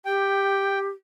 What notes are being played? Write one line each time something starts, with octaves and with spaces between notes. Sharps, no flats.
G4 G5